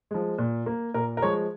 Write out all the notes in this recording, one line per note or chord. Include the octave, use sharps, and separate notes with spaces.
F3 G#3
A#2
A#3
A#2 A#4
A#4
F3 G#3 C#5